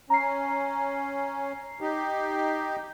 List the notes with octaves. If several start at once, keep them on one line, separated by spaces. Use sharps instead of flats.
C#4 A#5 C7
D#4 G4